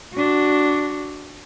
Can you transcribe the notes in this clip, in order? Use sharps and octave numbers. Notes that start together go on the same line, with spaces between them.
D4 F#4